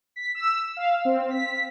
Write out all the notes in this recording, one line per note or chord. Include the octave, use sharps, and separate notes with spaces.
B6
E6
F5
C4
B6